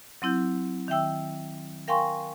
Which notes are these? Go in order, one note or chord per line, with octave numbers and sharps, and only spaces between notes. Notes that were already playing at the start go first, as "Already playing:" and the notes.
F#3 C4 E4 G6
D#3 E5 G5 E6
A#4 F5 G5 G#5 C6 C#6